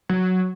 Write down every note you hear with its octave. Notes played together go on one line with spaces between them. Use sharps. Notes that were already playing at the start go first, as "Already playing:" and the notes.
F#3